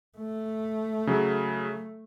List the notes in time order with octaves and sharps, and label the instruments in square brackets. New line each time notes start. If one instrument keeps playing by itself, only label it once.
[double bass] A3
[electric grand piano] C#3 F#3